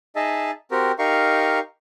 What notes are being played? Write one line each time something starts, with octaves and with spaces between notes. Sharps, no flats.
D#4 G#4 D#5 E5 A5
C4 F#4 G4 A#4
D#4 G4 A#4 F5 C#6